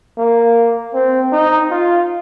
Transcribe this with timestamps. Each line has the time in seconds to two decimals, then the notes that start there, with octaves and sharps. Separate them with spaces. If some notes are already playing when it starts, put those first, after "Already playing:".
0.18 A#3
0.94 C4
1.32 D#4
1.71 F4